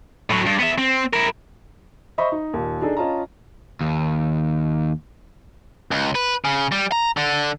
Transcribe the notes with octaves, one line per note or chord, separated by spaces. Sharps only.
A2 F#3
G2
B3 E5
C4
E4 A#4
C5 D#5 E5 B5 C#6
D#4
D#2 A#2
D4 D#4 G#4 A4
C#4 F4 D#5 A5 A#5
D#2
C#2
B4
C#3
G3
A#5
D3